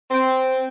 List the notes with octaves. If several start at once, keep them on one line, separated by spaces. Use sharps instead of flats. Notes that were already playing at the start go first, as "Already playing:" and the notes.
C4